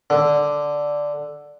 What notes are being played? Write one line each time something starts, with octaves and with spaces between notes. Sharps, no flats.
D3